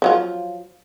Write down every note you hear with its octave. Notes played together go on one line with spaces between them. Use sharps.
F3 F#3 F4